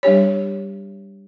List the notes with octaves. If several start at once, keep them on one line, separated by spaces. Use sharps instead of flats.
G3 D4 G4 C#5